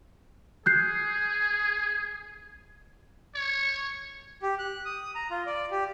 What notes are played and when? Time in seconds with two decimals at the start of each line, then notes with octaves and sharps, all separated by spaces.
0.66 G#4 F#6 G6 C7
3.35 C#5
4.42 G4
4.59 F#6
4.85 D#6
5.15 A#5
5.31 F4
5.47 D5
5.71 G4